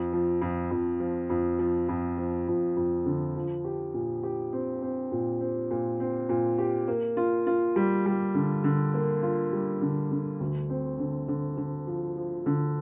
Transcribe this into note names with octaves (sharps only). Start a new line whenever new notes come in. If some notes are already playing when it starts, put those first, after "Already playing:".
Already playing: F2
F3
F2
F2
F3
F2
F3
F2
F3
F2
F2
D3
F3
G4
A#2
G4
C4
C4
A#2
C4
A#2
C4
A#2
G4
A#3
F4
F4
G3
G3
D3
D3
A#3
F4
G3
D3
D3
D2
C4
D3
D3
D3
F3
F3
D3